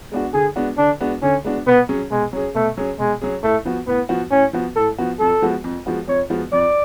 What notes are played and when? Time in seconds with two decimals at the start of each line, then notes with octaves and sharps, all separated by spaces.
0.12 G#3 B3 D4 F#4
0.34 D3 G#4
0.56 G#3 B3 D4 F#4
0.78 D3 D4
1.01 G#3 B3 D4 F#4
1.22 D3 C#4
1.45 G#3 B3 D4 F#4
1.66 B2 B3
1.89 F#3 C#4 G#4
2.11 B2 G#3
2.33 F#3 C#4 G#4
2.55 B2 A3
2.77 F#3 C#4 G#4
2.99 B2 G#3
3.22 F#3 C#4 G#4
3.43 A2 A3
3.65 F3 B3 F#4
3.87 A2 B3
4.09 F3 B3 F#4
4.31 A2 C#4
4.53 F3 B3 F#4
4.76 A2 A4
4.99 F3 B3 F#4
5.20 F2 A4
5.42 F3 G#3 B3 F#4
5.64 F2
5.86 F3 G#3 B3 F#4
6.08 F2 C#5
6.30 F3 G#3 B3 F#4
6.53 F2 D5